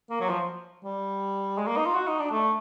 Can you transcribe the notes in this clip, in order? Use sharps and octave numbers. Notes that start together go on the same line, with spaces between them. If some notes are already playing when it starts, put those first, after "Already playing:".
A#3
F#3
F3
G3
G#3
A#3
D#4
F4
F#4
D#4
D4
A3